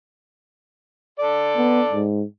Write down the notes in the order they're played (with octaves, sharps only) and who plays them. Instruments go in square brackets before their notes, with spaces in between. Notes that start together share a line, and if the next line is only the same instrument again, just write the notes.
[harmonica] A4 D5
[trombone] B3
G#2